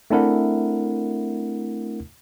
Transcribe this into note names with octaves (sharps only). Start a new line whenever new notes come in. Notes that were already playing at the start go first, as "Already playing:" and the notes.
A3 C4 D4 E4 A#4 F#5